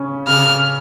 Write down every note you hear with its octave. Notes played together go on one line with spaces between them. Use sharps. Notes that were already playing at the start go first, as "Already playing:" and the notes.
Already playing: C#3 C#4
C#3 F6